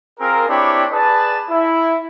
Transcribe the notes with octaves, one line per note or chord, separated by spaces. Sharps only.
C4 F4 G#4 A#4
C4 D4 E4 G4 C#5 B5
G#4 B4 D5 A5
E4